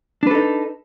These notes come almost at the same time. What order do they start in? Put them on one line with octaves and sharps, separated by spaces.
D4 B4 A4 D#4